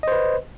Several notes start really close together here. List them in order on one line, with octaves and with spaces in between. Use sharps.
D#5 C5 B4